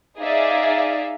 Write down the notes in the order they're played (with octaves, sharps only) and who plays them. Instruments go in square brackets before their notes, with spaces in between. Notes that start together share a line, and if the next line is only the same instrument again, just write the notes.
[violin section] D#4 G#4 D5 E5 F5